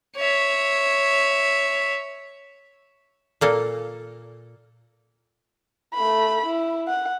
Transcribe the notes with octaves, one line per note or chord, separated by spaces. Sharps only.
C#5 E5
A#2 A#3 A4
A3 B5
E4
F#5